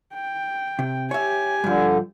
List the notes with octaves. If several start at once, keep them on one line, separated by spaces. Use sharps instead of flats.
G5
C3
G4 C#5 E5 G#5
G2 D3 F3